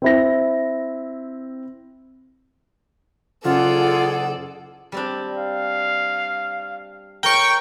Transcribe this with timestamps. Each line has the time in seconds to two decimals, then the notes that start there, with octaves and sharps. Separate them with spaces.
0.02 C4 E4 A#6
3.44 F#1 C#3 F4 G#4 A4 D5 F#5
4.92 G3 C4 D4
5.37 F5
7.23 A#4 C#5 G5 C#6